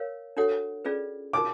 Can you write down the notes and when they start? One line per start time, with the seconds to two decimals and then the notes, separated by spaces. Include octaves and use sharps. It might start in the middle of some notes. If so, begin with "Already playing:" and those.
Already playing: A#4 C#5 F5
0.37 D4 F#4 A4 C#5 F#5
0.85 C#4 F4 G#4 B4 D5
1.33 D#4 F#4 A#4 D6